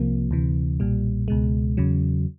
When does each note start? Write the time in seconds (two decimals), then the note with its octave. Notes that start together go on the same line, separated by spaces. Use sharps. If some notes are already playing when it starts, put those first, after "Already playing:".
Already playing: C2 C3 F3 A#3
0.31 D2 C3 E3
0.80 B1 A#2 G3
1.28 C#2 B2 G#3
1.77 E2 C#3 F#3